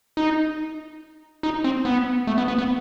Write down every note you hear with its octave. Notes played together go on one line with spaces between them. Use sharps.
D#4
D#4
C4
B3
A3
B3
B3
B3